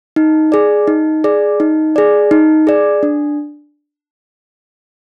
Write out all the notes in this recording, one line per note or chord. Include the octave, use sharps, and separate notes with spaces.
D#4
G#4 D5
D#4
G#4 D5
D#4
G#4 D5
D#4
G#4 D5
D4